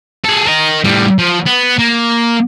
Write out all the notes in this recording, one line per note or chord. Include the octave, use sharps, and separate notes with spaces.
G#4 A4
A#4 D#5
A2 G3
F3
B3
A#3